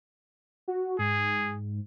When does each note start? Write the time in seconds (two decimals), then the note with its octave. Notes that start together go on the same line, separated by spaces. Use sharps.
0.68 F#4
0.99 G#2 G#4